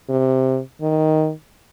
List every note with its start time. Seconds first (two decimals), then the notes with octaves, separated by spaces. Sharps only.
0.09 C3
0.81 D#3